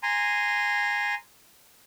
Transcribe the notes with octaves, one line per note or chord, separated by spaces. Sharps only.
G#5 A#5 C6